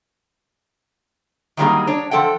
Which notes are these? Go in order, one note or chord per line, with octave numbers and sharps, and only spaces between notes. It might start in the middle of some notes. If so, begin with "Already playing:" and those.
D#3 F#3 G3 A#3 D#4 G#4
D4 C#5
F3 A4 F#5 G5